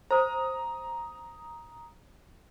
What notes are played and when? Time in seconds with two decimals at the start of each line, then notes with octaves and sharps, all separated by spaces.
0.11 C5 A#5 D#6